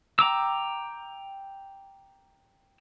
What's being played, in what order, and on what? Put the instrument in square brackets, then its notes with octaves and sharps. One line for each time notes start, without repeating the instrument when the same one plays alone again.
[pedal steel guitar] G5 A#5 D6 E6